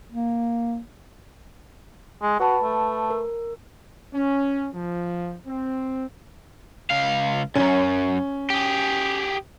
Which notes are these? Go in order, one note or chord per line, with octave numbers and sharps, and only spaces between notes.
A#3
G#3
F#4 B4 A5 B5
A3
A#4
C#4
F3
C4
C#2 F5
C2 F#2 C#4
G4 G#4